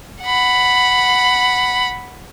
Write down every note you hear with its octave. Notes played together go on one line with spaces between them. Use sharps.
F#5 B5